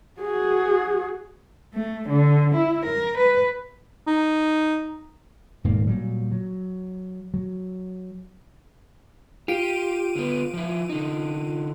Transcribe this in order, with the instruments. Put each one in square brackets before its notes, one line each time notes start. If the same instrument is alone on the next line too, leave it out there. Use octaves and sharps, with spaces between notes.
[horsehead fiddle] F#4 G#4
[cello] A3
D3
E4
A#4
B4
[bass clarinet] D#4
[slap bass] D#1 G#2 D#3 A#3
A#2 F#3 G3
F#3
F#3
[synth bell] F4 D7 D#7 [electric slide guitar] G4
[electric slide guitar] D3 B3
F3 E4
D3 D#4